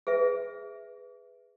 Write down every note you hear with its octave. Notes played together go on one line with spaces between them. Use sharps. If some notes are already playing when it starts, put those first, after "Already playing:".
G#4 B4 E5